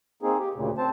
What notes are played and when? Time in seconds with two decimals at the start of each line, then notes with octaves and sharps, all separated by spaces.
0.23 A#3 C4 D#4 G#4
0.39 G4
0.55 D2 A#2 C#3
0.78 C4 C5 A5